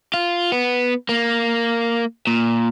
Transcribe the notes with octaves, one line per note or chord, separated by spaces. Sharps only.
F4
B3
A#3
A#2